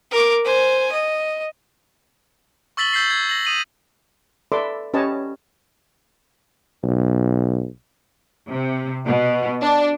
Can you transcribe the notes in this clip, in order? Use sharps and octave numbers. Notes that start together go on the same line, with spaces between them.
A#4 D6
C5 G#5
D#5
C#6 E6 A6 B6 F#7 G7
E6 G6 B6 C7
G#6
A#6 F#7
D#6 D#7 F#7
A4 B4 D5 E5 C6 D6
C#4 G4 B4 C#5 D#5 A5
B1
C3
B2
D4